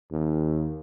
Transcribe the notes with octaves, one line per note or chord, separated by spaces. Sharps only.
D#2